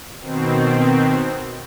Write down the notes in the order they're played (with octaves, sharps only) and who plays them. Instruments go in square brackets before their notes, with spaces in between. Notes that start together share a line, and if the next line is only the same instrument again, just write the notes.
[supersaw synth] B2 D#3 C4